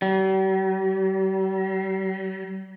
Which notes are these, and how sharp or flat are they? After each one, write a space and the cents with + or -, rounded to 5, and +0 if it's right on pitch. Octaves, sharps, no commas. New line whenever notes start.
G3 -45